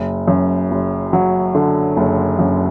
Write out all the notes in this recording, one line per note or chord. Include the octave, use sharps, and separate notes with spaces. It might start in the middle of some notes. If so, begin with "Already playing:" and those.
Already playing: F#1
F#2
F#1
F#3
D3
F#1
F#2